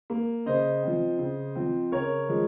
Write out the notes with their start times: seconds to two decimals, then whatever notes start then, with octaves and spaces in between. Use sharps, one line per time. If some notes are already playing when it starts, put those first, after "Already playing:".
0.10 A#3
0.46 C#3 C5 D#5
0.83 F3 C4
1.19 C#3
1.56 F3 C4
1.92 C#3 A#4 C#5
2.28 F3 G#3